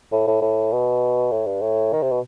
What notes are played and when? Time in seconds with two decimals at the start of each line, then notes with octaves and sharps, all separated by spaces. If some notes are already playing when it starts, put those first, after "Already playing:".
0.12 A2
0.27 A2
0.42 A2
0.72 B2
1.32 A2
1.46 G2
1.61 A2
1.93 D#3
2.02 C3
2.11 B2